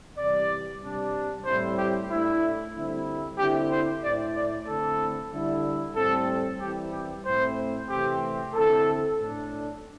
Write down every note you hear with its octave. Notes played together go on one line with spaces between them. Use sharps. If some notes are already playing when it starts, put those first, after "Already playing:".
C3 E3 G3 D5
C3 G3 D4
A2 G3 C4 E4 C5
G4
A2 A3 D4 E4
D3 G3 C4 E4
D3 C4 E4 G4
C5
A2 A3 E4 D5
D5
D3 A3 C4 E4 A4
D3 G3 E4
A2 G3 C4 A4
E3 G3 C4 E4 G4
G4
A2 A3 C4 E4 C5
C3 E3 A3 C4 G4
D3 C4 E4 A4
A2 A3 D4